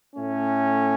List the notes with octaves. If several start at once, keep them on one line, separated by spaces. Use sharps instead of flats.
A2 A3 C#4